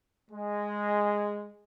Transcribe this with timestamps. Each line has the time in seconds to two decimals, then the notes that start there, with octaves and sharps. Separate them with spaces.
0.31 G#3